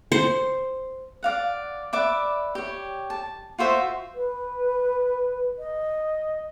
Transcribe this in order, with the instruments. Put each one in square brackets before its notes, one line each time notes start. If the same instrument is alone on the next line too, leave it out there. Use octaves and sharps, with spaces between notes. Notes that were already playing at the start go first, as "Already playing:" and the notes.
[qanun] C5
[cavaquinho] D5 F5 F#5
B4 D5 E5 D6
G4 C#5
A5
F4 F#4 C5 E5
[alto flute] B4
D#5